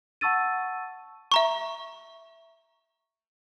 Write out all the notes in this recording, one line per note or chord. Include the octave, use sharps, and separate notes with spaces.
F#5 A5 C#6 E6 A6 D#7
E5 A#5 C#6